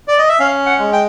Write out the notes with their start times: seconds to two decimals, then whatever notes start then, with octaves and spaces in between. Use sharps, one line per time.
0.08 D5
0.18 D#5
0.29 E5
0.39 C#4 F5
0.66 F#5
0.79 G#3
0.93 G5